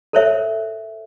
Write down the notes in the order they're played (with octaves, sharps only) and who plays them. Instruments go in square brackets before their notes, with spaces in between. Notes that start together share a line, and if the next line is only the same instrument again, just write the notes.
[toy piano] A4 A#4 C5 C#5 E5